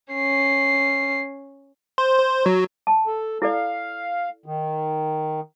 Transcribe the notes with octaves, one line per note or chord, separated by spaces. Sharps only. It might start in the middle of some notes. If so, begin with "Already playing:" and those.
C#4 C7
C5
C5
F#3
A5
A4
E4 A4 D5 F5
D#3